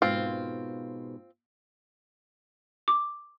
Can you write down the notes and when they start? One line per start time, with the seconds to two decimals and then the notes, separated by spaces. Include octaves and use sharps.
0.02 G#2 B2 A#3 C4 F4
2.88 D6